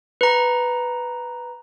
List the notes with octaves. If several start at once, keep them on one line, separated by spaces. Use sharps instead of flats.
B4 A#5